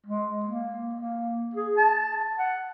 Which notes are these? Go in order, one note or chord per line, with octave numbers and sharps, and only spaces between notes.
G#3
A#3
A#3
G#4
A5
F#5